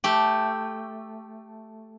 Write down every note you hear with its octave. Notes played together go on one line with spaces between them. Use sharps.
A3 G4